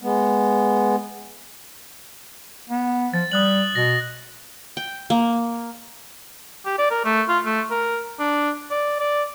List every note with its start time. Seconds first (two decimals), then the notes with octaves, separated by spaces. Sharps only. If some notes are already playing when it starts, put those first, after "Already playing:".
0.02 G#3 B3
2.69 B3
3.14 F3 A6
3.32 G3 D#6 F#6 F#7
3.75 B2 A#6
4.77 G5
5.10 A#3
6.66 G4
6.78 D5
6.91 A#4
7.05 A3
7.29 F4
7.46 A3
7.71 A#4
8.19 D4
8.71 D5
9.00 D5